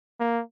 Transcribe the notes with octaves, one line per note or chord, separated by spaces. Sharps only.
A#3